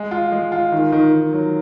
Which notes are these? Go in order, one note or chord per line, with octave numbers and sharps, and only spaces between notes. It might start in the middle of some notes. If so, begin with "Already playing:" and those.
Already playing: G#3
F4
G#3
F4
D#3
D#3
D#3
F#3